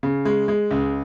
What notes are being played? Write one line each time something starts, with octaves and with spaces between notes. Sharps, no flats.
C#3
G#3
G#3
C#2